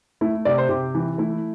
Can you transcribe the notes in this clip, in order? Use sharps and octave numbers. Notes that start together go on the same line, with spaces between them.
A3 E4
C3 D5
C5
C3 G4
E3
A3 E4